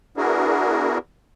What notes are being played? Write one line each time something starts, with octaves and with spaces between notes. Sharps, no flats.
B3 D4 E4 F#4 G#4 A#4